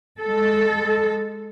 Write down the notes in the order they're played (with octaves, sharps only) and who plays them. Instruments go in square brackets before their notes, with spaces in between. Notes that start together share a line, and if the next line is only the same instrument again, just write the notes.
[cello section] G#3 A4